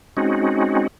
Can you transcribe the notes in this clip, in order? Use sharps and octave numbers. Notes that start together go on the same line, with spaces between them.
G#3 C4 C#4 D#4 F#4